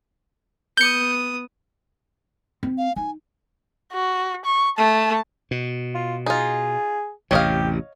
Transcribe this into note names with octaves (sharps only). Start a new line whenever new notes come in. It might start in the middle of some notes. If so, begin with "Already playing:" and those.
B3 D#6 G6 C#7
C4
F5
D#4 G#5
F#4
C#6
A3 A5
B2
F4
D#4 F4 G#4
A1 E2 C3 G4 C#5 D#5 F5